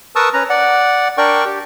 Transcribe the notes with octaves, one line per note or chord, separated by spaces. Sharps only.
A#4 B4 A5 C#6 D#6 E6
C#4 B4 A#5
D5 F#5
D4 A#4 D5 G5 C#6
G4